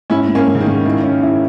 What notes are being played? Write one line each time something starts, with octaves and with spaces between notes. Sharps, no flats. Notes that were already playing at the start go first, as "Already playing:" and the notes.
G#2 C#4 E4
G#2
A#3 C#4
G#2
C#3
D#3
G#2
D#3 E4
C#4
E4